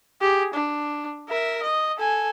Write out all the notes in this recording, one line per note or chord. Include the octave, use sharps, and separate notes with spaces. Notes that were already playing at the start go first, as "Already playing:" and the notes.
G4 G#4
D4
A#4 E5
D#5
A4 G#5